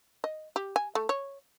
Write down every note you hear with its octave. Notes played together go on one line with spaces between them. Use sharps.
D#5
G4
G#5
A3
C#5